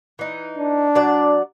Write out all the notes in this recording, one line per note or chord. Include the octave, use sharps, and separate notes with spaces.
E3 D#4
D4
F#3 D5